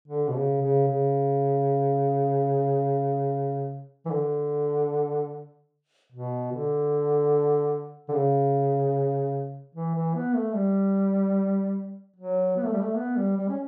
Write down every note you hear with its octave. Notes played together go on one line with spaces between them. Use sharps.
D3
B2
C#3
C#3
C#3
E3
D3
B2
D3
D3
C#3
E3
E3
B3
A3
G3
F#3
B3
A3
G3
A3
B3
G3
G3
C#4